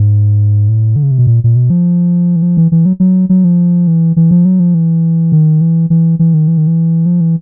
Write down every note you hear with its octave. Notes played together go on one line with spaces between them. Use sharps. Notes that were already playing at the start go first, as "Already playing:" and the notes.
Already playing: G#2
A2
D3
C#3
C3
B2
A#2
A#2
B2
F3
E3
F3
E3
E3
F#3
F#3
F#3
F3
E3
E3
F3
F#3
F3
E3
D#3
E3
E3
E3
D#3
E3
D#3
E3
F3
E3